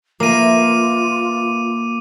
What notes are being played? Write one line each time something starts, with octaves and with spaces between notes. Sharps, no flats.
A#3 F4 B4 E5 D6 D#7